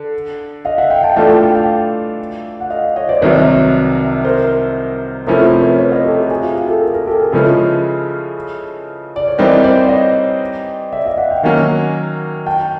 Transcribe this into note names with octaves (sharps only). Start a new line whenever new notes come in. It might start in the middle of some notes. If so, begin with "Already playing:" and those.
Already playing: D3
D#5 F5
E5 F#5
F5 G5
G5 A5
E3 A3 D4 F4 A4 G5 A5
G5 A5
F5 G5
F5 G5
F#5
D#5 F5
C#5 D#5
C5 D5
C2 C3 D#3 F#3 B4 C#5
A#4 C5
C3 F3 A3 C#4 E4 A#4 C5
A#4 C5
B4 C#5
B4 C#5
C#5 D#5
G4 A4
F#4 G#4
F#4 G#4
F4
F4 G4
G4 A4
G#4 A#4
G#4 A#4
G4 A4
G#4 A#4
C#3 F3 G#3 C#4 E4 A4 B4
D5
C#5
E3 G3 C4 D#4 G4 A#4 C5
C5 D5
C#5 D#5
D5 E5
D#5 F5
E5 F#5
F5 G5
D#3 F#3 A#3 C#4 F#4 F#5 G#5
G5 A5